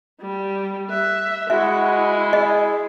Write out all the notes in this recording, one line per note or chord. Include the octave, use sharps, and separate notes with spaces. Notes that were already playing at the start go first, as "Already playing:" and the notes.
G3
E5 F#6
G#3 E4 F#4 E5
G#4 D#5